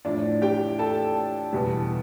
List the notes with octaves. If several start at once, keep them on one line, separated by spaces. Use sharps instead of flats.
A2 F3 D4 D5
G4 G5
A4 A5
E2 B2 G3